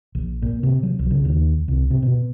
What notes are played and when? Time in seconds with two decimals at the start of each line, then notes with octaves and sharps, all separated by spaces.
0.15 A#1
0.42 A#2
0.63 C3
0.83 F#3
0.99 B1
1.11 C#3
1.25 D#2
1.68 C2
1.90 C3
2.03 B2